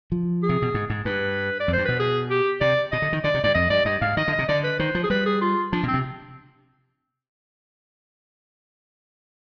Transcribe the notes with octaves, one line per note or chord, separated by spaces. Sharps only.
F3
G#4
C3
B2
G#2
G#2
G2 B4
D5
F2
G2 C5
B2 B4
G#4
G4
C3 D5
B2 D#5
D3
D#3
D3 D5
C3
G2 D5
F2 D#5
G2 D5
G2 D#5
G#2 F5
D#3 D#5
D3 D#5
C3
D3 D5
B4
D#3 C5
F3
G#4
G3 B4
G#4
F4
F3 D4
B2
C4
C3